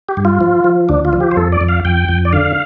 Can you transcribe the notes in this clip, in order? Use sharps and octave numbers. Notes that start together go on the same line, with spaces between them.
G4
G2
F4
F3
F3
D2 D4
F4
F3
G4
C5
F2 A4
D5
F2
F5
F2 G5
F2
D5
D3 F5